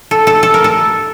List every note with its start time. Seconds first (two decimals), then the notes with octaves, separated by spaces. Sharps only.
0.11 A4
0.27 A4
0.43 A4
0.54 A#4
0.64 A4